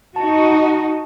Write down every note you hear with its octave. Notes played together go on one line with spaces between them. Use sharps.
D#4 F#4 A5